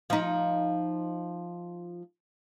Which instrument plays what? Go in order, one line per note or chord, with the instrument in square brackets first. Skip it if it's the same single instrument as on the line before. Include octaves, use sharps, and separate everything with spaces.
[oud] F3 D#4